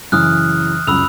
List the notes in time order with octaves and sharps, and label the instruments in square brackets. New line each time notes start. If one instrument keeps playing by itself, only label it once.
[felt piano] F#2 C#3 E3 [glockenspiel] D#6 F6 F#6
[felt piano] C#2 F#2 [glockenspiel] B5 E6 F7